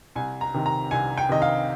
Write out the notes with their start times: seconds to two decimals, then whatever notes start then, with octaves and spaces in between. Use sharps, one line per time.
0.16 C2 G#5
0.41 A#5
0.54 C3 D#3
0.66 A#5
0.91 C2 G#5
1.18 G5
1.29 C3 D#3 D#5
1.42 F5